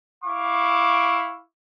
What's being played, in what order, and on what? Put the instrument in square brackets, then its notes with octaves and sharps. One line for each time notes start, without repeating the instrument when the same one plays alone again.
[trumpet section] E4 F5 C#6 D6